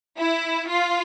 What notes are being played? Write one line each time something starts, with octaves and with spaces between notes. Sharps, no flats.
E4
F4